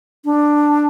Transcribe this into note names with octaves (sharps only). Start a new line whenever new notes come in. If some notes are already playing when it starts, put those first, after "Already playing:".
D4